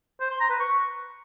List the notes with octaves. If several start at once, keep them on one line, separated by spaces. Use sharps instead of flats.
C5
C6
A#5
B4
C#6